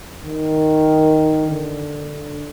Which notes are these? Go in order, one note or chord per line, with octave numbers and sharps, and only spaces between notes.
D#3
D3